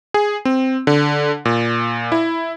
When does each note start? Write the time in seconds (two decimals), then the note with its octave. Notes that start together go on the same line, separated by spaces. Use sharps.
0.14 G#4
0.45 C4
0.87 D3
1.45 A#2
2.12 E4